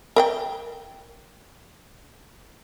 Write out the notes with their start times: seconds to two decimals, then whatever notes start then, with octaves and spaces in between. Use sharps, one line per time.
0.16 A#4 F#5 G5